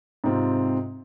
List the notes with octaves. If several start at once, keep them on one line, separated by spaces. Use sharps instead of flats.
G#2 C3 C4 F4